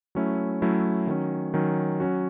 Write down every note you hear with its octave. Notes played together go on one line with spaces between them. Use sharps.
F#3 A3 C#4 E4
F#3 A3 C#4 E4
D#3 F#3 C#4
D#3 F#3 C#4
F#3 C#4 F#4